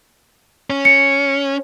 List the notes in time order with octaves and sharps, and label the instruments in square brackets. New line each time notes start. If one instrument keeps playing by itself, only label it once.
[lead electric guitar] C#4
[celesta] C#7